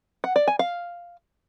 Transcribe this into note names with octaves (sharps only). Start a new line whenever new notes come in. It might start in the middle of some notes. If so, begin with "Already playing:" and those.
F#5
D5
G#5
F5